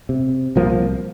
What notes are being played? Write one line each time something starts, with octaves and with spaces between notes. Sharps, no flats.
C3
C2 F3 A#3